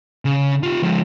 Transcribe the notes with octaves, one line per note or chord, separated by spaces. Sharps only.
C#3
F4 G4
F3 G#3